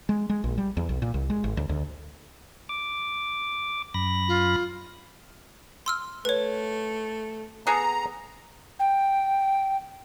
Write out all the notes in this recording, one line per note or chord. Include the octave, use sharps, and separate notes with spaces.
G#3
G#3
A#1
G3
E2
B1
A#2
C2
G#3
G#1
D2
D2
D6
F#2 B5 A#6
F4
C6 E6 F6
A3 B4 C#5
B3 G#4 A4 A#5
G5